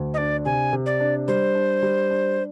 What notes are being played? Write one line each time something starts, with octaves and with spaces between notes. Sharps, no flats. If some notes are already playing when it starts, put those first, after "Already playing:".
Already playing: D2
D#5
D4 D5
C3 G#5
C3
D5
D4
G3 C5
D4
G3
D4